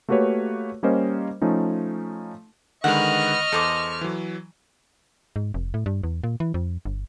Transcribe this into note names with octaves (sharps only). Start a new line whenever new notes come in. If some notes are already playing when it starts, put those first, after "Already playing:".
A3 A#3 F#4 G4 B4 C#5
G3 A#3 C#4 A#4 C5 D#5
F3 A3 C#4 D#4
D3 D#3 G#3 B4 D#5 F#5 C#6 F6
E2 A4 C5 D6
E3 F#3
G#2
F1
A2
G2
E2
A#2
E3
F2
G1